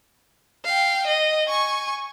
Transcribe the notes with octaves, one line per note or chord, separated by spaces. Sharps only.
F5 G5
D#5
G#5 C#6